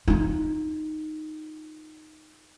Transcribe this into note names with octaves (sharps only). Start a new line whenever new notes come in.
D#4 F4